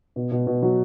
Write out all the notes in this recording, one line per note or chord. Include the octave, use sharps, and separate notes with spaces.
B2
B2
B2
F#3